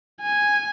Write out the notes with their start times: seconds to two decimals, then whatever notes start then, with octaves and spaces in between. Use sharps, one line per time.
0.21 G#5